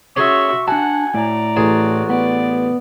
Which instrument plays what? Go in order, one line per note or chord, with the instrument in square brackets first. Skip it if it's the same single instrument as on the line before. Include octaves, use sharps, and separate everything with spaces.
[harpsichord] C#4 G#4 C#5 [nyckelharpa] F#4 E5 [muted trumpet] C#6
[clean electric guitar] D4 A5 [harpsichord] F#4 [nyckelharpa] F#5 [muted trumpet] G#5
[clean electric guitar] A2 [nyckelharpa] D5 A#5
[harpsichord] A1 G#4 A5 [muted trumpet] F#4
[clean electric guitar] B3 [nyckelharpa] D5